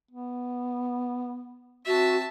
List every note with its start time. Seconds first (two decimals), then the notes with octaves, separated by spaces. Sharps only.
0.11 B3
1.85 C4 F#4 E5 A5